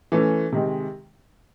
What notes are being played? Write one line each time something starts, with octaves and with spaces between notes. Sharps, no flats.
E3 A3 C#4
C3 D#3 G#3